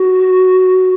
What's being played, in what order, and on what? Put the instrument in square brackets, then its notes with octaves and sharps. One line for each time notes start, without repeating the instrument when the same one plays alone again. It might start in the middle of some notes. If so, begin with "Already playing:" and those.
Already playing: [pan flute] F#4